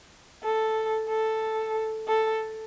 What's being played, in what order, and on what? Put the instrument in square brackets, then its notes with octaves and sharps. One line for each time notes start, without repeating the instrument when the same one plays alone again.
[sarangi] A4
A4
A4